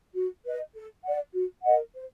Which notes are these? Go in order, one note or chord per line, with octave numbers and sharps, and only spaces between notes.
F#4
B4 D#5
A4
D5 F#5
F#4
A#4 D#5 F#5
C5